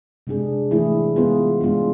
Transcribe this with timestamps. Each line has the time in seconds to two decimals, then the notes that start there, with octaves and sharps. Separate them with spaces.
0.27 C3 G#3 D4 G#4
0.71 E3 A3 E4 G#4
1.16 G#3 B3 F4 G#4
1.61 G#3 B3 D4 F4